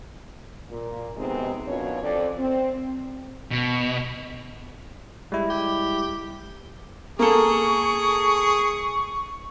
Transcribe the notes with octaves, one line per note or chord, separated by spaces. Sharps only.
A#2
F#2 C3 G#3 B3 C4 D#4
F#2 B2 D4 F4 C#5
F2 D5
C4
B2
G3 G#3 E4
G4
A#3 G#4 A4 C#6